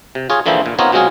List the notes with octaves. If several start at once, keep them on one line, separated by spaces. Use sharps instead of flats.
C3
F4 G#4 C#5
D3 E3 F3 A#3 E4 C5
A#2
B3 C4 D#4 F4 A#4 C#5
B2 F#3 G#3 C4 F4 G#4